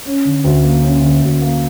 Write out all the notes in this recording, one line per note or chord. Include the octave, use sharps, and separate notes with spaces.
C#4
D3
D2
A#3
C#4
D3
D2
A#3